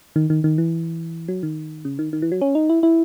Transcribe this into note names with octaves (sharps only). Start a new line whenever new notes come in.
D#3
D#3
D#3
E3
F#3
D#3
C#3
D#3
D#3
E3
F#3
C#4
D#4
E4
E4